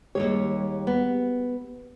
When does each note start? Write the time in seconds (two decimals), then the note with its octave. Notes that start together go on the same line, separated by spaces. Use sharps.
0.15 D#2 G#2 G3 G#3 G4 C#5
0.87 B3